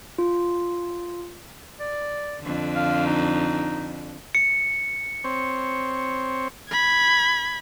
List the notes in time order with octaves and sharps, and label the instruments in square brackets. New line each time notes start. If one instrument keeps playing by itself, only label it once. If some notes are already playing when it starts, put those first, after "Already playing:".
[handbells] F4
[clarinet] D5
[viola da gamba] F2 D3
[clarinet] F5
D#4
[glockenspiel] C#7
[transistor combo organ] C4 C#5
[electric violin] B5 G#6